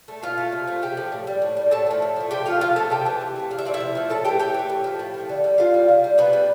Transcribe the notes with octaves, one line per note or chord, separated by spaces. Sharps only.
A3
B2 F4 F5
A3
C3
F3 A3
C3 G4 G5
F3 A3
A2
G3
A2
G3
A2 A4 A5
F3 A3
A2
F3 A3
C3 G4 G5
F3 A3 F4 F5
C3 F4 F5
F3 A3 A4 A5
C3 G4 G5
E3 A3
C3
E3 A3
C3 F5
E5
F3 A3 D5
E4 E5
C3
F3 A3
A2 A4 A5
E3 A3 G4 G5
A2 G4 G5
E3 A3
A2
F3 A3
A2
F3 A3
D3
G3
D3 F4 F5
G3
C3
G3
C3 B3 B4
G3